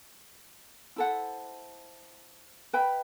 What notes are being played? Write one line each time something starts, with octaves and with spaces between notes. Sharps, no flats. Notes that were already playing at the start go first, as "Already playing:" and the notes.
E4 A4 C5 F#5
B4 E5 G5 B5